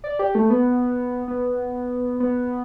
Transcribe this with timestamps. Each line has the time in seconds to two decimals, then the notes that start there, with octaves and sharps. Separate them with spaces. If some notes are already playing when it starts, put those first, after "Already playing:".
0.04 D5
0.19 G4
0.35 A3
0.50 B3
1.28 B3
2.20 B3